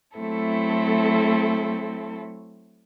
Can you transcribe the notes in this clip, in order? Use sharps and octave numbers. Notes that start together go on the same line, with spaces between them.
F#3 A3 C4 E4 A4